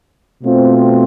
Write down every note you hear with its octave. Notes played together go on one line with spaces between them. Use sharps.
B2 A3 C4 F4